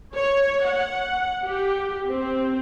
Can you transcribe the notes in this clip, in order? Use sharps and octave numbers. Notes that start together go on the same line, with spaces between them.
C#5
F#5
G4
C4